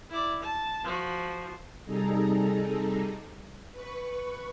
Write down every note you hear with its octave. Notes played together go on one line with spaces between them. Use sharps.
E4 D5
A5
F3 F#4
C3 G3 D#4 G#4 A4 A#5
B4 C#6